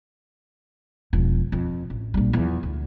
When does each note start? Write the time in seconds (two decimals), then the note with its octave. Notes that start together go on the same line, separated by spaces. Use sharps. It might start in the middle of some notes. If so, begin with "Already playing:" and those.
1.13 E1 F3
1.52 F2
1.90 A1
2.14 A#1 G3
2.33 E2 F3
2.63 D2